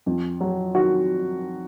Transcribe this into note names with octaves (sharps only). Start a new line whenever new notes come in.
F2
F#3
D#3 F#4